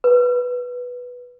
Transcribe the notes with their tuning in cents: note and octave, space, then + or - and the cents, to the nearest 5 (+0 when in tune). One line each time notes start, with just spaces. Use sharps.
B4 -5